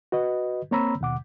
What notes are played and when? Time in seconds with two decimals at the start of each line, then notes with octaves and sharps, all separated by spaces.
0.12 F#4 B4 D#5
0.71 A#3 C4 C#5 A#5 B5 E6
1.01 D#2 B2 F#5 D6